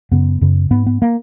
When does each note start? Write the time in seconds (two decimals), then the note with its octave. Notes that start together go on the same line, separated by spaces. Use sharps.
0.11 F#2 C#3 B3
0.41 F#2 C#3
0.70 G#2 B3
0.87 B3
1.02 A#3